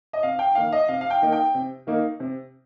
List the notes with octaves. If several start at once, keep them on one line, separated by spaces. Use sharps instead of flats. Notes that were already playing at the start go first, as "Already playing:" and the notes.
D#5
C3 F5
G5
D#3 A#3 D#4 F5
D#5
C3 F5
F5
G5
D#3 A#3 D#4
G5
C3
D#3 A#3 D#4
C3